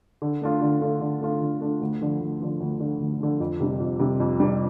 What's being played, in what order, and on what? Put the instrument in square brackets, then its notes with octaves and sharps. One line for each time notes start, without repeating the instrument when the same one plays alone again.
[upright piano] D3
A3 D4 F4
D3
A3 D4 F4
D3
A3 D4 F4
D3
A3 D4 F4
D2
D3 F3
D2
D3 F3
D2
D3 F3
D2
D3 F3
F2
C3 G3
F2
C3 G3
F2
C3 G3